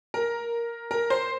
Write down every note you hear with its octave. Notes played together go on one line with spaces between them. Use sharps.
A#4
A#4
C5